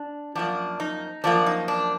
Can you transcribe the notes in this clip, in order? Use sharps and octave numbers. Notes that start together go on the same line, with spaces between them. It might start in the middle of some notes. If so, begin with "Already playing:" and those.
Already playing: D4
F#2 F3 A#3 D4
D#4
F#2 F3 A#3 D4
D#4
D4